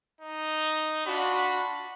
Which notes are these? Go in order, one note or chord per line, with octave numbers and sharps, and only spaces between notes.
D#4
D4 F4 F#4 B5